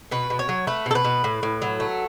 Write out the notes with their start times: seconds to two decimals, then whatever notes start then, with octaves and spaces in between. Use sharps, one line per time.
0.11 B2 B4
0.30 B2
0.39 C#5
0.49 F#3
0.67 A3 B4
0.86 B2 A4
0.95 B4
1.04 B2
1.24 A2
1.43 A2
1.62 F#3
1.80 A3